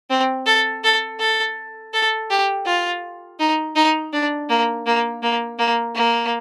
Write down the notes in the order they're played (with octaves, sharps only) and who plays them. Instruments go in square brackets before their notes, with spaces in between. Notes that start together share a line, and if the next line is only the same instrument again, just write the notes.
[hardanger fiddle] C4
A4
A4
A4
A4
G4
F4
D#4
D#4
D4
A#3
A#3
A#3
A#3
A#3